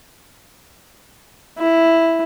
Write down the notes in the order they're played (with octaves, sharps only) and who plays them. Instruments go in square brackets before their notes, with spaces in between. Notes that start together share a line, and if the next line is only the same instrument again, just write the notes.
[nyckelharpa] E4